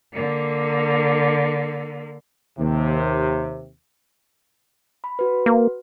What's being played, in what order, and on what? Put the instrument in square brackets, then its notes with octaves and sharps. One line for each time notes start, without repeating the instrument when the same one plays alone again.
[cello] D3 A#3
[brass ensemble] D#2 C3
[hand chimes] B5
F#4 B4
[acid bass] A#3